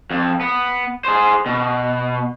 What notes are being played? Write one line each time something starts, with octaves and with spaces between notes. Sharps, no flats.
F2
B3
G#4 C5
B2